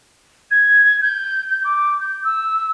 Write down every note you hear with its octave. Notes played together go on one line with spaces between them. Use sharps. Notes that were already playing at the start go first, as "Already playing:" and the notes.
G#6
G6
G6
D6
G6
E6